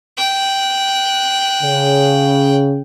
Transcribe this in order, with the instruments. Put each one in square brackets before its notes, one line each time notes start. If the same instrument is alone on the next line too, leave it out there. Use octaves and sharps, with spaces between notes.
[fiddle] G5 F#6
[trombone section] C#3